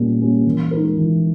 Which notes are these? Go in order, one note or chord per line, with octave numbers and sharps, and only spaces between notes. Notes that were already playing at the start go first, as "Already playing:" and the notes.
Already playing: A#2 G3 A#3 C#4
G3 A#3 C#4
E3
G#3 D#4 A#4
E3